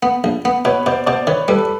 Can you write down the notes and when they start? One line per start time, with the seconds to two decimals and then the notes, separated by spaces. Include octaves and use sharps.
0.03 B3
0.24 A#1
0.45 B3
0.65 B2 B4 C#5
0.86 B2 C5 D5
1.06 B2 C5 D5
1.27 D#3 B4 C#5
1.48 G3 A4 B4